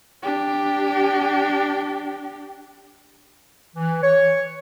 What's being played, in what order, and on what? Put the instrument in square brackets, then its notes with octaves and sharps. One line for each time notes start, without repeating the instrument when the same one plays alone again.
[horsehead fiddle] D4 G4
[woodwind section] E3
C#5